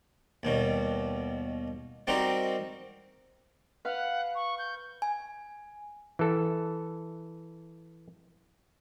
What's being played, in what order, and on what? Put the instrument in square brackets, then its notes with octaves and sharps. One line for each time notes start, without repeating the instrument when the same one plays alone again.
[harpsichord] D#2 B2 G3
G3 C4 D#4 F#4 G4 A#4
[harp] B4 F5 [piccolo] F#5
[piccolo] C#6
G6
[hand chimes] G#5
[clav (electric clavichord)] E3 A4